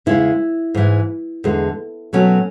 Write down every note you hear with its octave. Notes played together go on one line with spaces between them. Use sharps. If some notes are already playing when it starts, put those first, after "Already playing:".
E2 C#3 G#3 E4
G#2 E3 G#3
E2 D3 G#3
B2 F#3 A3 C#4